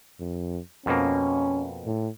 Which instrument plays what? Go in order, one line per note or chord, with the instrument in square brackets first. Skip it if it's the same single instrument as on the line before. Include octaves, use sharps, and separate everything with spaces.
[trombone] F2
[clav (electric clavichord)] F2 B2 A#3 [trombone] C#4
[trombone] A2